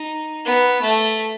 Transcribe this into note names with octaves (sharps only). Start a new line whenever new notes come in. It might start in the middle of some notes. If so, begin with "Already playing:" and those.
Already playing: D#4
B3
A3